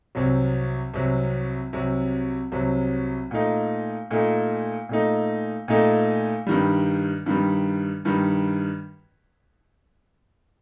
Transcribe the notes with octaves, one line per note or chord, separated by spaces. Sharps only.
C2 C3 F#3
C2 C3 F#3
C2 C3 F#3
C2 C3 F#3
A#2 A3 D#4
A#2 A3 D#4
A#2 A3 D#4
A#2 A3 D#4
G2 D#3 G3
G2 D#3 G3
G2 D#3 G3